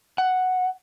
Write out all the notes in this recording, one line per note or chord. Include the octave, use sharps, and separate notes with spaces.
F#5